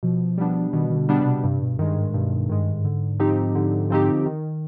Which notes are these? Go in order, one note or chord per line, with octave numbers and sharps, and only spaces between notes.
B2 F3
G3 B3 D4
B2 D#3
D#3
D3
G3 B3 D4
C3
G2 C3
B2
G2 D#3 G#3
G#2
G2 B2
G#2 D#3 G#3
G2
G#2
D3
F3 C4 D#4 G4
D3
F3 C4 D#4 G4
D#3